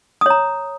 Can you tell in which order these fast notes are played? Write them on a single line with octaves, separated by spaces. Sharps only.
D#6 C#5 A#5